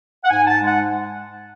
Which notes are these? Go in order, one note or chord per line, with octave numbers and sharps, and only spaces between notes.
F#5
G#2 G#5
A5
G#3
F#5